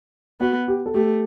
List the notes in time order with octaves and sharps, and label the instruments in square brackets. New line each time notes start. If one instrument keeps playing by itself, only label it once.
[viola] B3 [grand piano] F#4
[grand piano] G4
A4
[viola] A3 [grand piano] G4